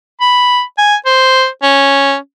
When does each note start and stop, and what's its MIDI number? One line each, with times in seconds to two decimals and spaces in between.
0.21 0.61 83
0.78 0.95 80
1.06 1.47 72
1.63 2.16 61